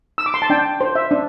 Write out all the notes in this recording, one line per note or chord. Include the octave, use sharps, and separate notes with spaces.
E6
D6
C6
A5
D4 G5
C5
E5
D4